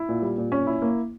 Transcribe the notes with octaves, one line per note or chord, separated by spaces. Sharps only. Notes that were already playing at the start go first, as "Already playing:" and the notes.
Already playing: E4
A#2
G3
A#2
C#4
E4
A#3